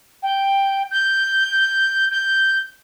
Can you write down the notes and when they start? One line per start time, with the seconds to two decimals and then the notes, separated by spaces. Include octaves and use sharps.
0.22 G5
0.91 G6
2.11 G6